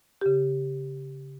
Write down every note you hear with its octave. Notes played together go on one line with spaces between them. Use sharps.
C#3 G4